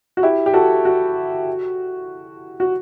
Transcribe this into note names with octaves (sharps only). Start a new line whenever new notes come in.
F#4
E4 G4
G4
F#4 A4
F#4
F#4